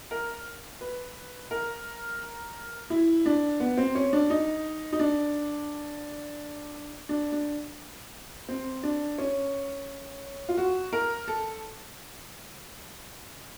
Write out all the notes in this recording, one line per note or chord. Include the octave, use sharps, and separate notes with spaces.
A#4
B4
A#4
E4
D4
B3
C4
C#4
D4
D#4
D#4
D4
D4
D4
C4
D4
C#4
F4
F#4
A#4
A4